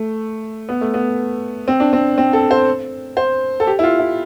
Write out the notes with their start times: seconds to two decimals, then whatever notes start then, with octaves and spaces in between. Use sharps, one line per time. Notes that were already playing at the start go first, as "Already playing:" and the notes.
Already playing: A3
0.69 B3
0.81 A3
0.94 B3
1.68 C4
1.80 D4
1.93 C4
2.18 C4
2.33 A4
2.51 C5
3.17 C5
3.60 A4
3.67 G4
3.79 E4
3.83 F4
4.00 E4